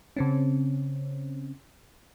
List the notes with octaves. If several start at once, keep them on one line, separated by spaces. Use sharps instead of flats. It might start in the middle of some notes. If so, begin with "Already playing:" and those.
C#3 C4 C#4